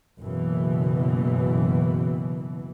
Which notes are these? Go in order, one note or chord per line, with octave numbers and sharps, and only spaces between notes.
F#1 B2 E3